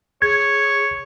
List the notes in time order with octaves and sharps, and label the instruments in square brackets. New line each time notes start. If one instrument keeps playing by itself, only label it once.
[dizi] G#4 [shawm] C#5 [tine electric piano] G#6